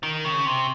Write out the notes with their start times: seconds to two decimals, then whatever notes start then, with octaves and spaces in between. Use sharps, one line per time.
0.03 D#3
0.25 C#3
0.46 C3